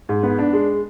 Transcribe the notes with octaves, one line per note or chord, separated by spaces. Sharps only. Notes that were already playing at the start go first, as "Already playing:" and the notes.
G#2
B3
D4
G#3